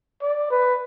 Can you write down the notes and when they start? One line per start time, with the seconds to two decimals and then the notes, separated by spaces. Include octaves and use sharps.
0.22 D5
0.50 B4